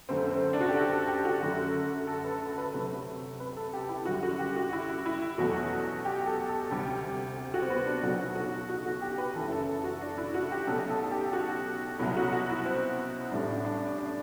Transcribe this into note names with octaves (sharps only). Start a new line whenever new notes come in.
F#2 D3 A3 C4
C4
D4
F#4
G4
A4
A4
G4
F#4
F#2 D3 A3
A4
B4
A4
A4
B4
D2 C3 F#3 A3 B4
B4
A4
G4
E4
F#2 D3 G3 F#4
F#4
G4
F#4
E4
E4
E2 B2 F#3 A3 F#4
G4
A4
A4
D2 C3 G3 G4
G4
F#4
C4
B3
D4
B1 B2 F#3 A3 F#4
F#4
F#4
F#4
G4
B4
F#1 F#2 E3 A4
A4
A4
F#4
D4
E4
F#4
G4
B1 B2 F#3 A3 A4
A4
A4
G4
F#4
C2 B2 F#3 E4
F#4
F#4
E4
C4
A1 A2 G3 D4
D4
D4